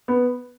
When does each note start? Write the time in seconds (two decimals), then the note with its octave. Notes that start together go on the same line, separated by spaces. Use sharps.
0.08 B3